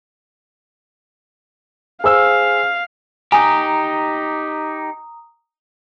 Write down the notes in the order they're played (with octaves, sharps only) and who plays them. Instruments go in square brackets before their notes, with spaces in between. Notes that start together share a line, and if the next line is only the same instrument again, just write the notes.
[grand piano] G#4 C5 E6 [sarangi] F5
[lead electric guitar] D#4 G4 [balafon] G#5 [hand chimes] A#5 D#6